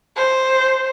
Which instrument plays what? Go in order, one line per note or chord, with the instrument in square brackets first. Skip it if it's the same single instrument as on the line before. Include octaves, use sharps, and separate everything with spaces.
[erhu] C5